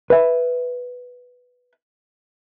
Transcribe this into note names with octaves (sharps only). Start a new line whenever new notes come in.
B4 E5